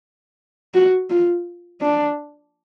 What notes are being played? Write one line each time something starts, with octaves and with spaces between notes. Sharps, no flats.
F#4
F4
D4